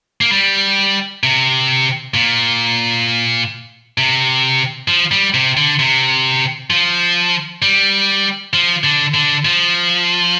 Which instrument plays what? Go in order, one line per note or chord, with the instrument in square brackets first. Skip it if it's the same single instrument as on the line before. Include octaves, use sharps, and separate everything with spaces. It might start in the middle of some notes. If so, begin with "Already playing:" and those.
[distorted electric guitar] A#3
G3
C3
A#2
C3
F3
G3
C3
D3
C3
F3
G3
F3
D3
D3
F3